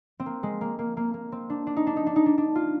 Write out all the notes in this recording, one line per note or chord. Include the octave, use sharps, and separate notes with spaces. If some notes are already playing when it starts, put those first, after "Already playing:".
C4
A#3
G#3
A#3
A#3
A#3
A#3
C4
D4
D4
D#4
D4
D#4
D4
D#4
D4
D4
F4